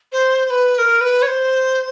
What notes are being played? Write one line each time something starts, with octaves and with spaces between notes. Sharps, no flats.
C5
C5
B4
A#4
B4
C#5
C5